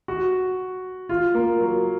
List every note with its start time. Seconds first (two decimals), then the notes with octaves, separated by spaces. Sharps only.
0.08 F#4
1.09 F4
1.35 A#3
1.61 F#3